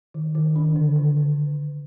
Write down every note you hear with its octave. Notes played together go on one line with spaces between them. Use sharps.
D#3
D#3
D4
D3
D3
D3